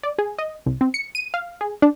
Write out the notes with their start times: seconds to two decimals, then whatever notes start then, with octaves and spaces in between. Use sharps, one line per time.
0.03 D5
0.19 G#4
0.38 D#5
0.66 C2
0.81 C4
0.94 C#7
1.15 D#7
1.34 F5
1.61 G#4
1.82 D4